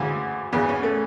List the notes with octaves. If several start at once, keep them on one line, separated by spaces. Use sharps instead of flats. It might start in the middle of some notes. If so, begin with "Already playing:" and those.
Already playing: D2 C#3 E3
E2 C#3 E3 B3
C#4
A3